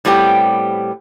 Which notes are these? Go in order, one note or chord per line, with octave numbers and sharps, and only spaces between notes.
A2 G3 B3 C4 G4